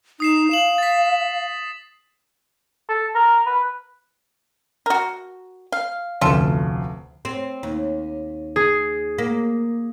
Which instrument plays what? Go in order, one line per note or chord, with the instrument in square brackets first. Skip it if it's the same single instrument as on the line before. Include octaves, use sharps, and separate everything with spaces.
[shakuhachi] D#4 [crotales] D#6 C7 E7
[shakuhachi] F5 [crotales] E7 F#7
[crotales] A6 B6
[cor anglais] A4
A#4
B4
[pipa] F#4 A#4
F5
[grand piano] F1 D2 [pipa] C#4 F4 A4
[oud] C4
D#2
[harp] G#4
[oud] A#3